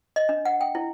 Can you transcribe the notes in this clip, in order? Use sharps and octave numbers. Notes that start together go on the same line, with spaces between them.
D#5
D4
F#5
G5
E4